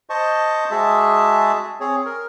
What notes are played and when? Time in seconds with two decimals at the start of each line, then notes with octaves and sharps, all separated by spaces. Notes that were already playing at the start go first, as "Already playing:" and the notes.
0.10 C5 D#5 A5 C#6
0.71 G#3 F#4 G#4 E5 A5
1.80 C4 G#4 C#5
2.06 A#4